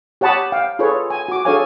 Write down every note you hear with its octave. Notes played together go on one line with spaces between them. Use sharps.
G4 C#5 F#5 A5 B5 D#6
F5 G5
F4 G#4 A4 B4 C#5
G#5
F#4 D6
D4 G#4 A4 C#5 F5 G#5